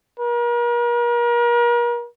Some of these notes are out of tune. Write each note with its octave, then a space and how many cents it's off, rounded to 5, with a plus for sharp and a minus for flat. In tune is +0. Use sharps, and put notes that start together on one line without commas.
A#4 +40